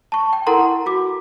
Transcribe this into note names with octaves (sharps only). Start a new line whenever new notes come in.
A5 C#6
G5
E4 A4 A#4 F#5 A#5 C6
F#4 D6